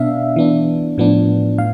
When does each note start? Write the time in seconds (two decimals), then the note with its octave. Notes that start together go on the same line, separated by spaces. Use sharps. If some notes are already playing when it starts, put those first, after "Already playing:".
Already playing: B2 B3 D4 E5 F5
0.36 E3 B3 D4
0.98 A2 F3 B3 D4
1.58 A2 F5